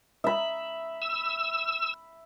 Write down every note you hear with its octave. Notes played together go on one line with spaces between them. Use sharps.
E5 B5
E6